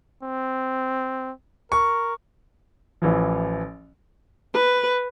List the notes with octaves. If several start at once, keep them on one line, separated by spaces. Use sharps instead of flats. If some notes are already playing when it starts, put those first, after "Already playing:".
C4
A#4 C#6
A1 E3 F3
B4